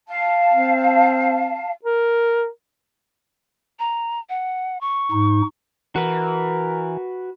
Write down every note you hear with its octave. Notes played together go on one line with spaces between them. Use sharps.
F5 A5
C4
A#4
A#5
F#5
C#6
G#2 D#4
E3 F#4 A#4 B4